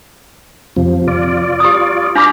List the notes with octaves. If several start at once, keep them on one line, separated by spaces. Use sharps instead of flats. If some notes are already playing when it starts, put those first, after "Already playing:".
F2 C3 F3
F4 D5
G4 D#6
D4 F5 A#5 B5 D6